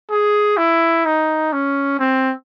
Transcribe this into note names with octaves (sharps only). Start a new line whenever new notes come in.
G#4
E4
D#4
C#4
C4